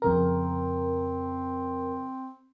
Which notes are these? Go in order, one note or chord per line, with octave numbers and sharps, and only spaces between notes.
F2 C#3 C4 A#4